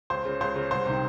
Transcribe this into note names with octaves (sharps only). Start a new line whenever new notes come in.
C#2 C5
C#3
C#2 C5
C#3
C2 C5
C3 D#3